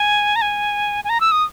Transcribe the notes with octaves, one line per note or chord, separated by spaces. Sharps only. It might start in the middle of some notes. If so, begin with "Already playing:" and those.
Already playing: G#5
A#5
G#5
G#5
A#5
E6
D#6